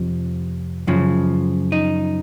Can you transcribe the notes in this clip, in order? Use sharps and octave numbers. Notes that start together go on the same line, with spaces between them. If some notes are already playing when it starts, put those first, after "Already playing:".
Already playing: F2 C3 F3
F#2 C#3 F3
D#4